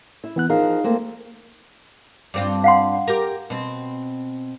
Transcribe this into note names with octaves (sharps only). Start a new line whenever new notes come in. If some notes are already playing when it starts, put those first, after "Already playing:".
E4
E3 B3 F#6
F3 D#4 G#4 A#4 F5
A3 A#3 C4
G2 C4 F4
F5 F#5 C6
G4 A#4
B2 C4